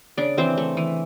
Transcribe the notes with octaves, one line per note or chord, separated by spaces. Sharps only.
C#3 D4 D5
E3 C4 C5
A3
E3